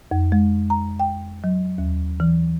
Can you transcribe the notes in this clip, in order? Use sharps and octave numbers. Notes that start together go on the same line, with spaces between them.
F2
G#3
A#5
G5
F#3
D#2
E3